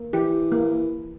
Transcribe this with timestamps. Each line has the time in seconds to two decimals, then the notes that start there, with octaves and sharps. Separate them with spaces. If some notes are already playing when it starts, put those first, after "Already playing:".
Already playing: A#3
0.13 E3 G4
0.52 A#3